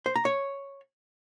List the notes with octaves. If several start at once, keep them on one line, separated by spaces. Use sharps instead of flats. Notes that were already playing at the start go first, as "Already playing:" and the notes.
C5
A#5
C#5